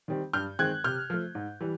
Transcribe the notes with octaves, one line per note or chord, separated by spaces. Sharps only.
D#3 G3 C4
G2 F6 G6
D#3 G#3 C4 F#6 G#6
C3 F6 G6
F3 A3
G#2
E3 G3